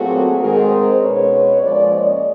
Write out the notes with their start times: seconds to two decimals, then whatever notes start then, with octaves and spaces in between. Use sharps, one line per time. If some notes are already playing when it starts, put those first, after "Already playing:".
Already playing: A#2 F#3 A3 C4 F#4 G#4
0.40 G#2 D#3 G#3 C4 G#4 A#4
0.70 A#4 C5
1.01 B2 G#3 C#4 B4 C#5
1.62 A#2 F3 G#3 C#4 C5 D5
1.93 C#5 D#5